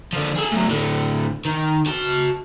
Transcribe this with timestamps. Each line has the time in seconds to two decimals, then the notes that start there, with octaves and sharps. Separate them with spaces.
0.13 D3 F3
0.36 G#4 A4
0.52 A2 F#3
0.69 A2 D3
1.45 D#3
1.87 F#4 A5